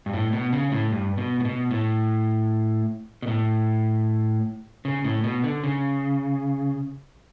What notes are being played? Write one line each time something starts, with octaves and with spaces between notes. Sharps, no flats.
G2
A2
B2
C#3
A2
G2
B2
A2
B2
A2
B2
A2
C#3
A2
B2
D3
C#3